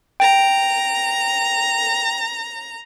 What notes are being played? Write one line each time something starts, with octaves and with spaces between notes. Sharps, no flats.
G5 A#5